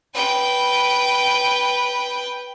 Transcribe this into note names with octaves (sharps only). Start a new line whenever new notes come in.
B4 G5